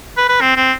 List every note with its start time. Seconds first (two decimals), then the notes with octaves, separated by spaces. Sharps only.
0.17 B4
0.29 B4
0.41 C4
0.56 C4